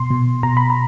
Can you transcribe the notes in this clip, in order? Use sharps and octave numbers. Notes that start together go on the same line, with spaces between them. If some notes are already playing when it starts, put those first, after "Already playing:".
Already playing: B2 C6
B2
B2 A#5
B5
A#5